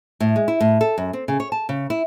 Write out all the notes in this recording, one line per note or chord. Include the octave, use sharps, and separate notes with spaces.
A2
G#3
E4
A2
A4
F#2
C4
C#3
C#5
A5
C#3
E4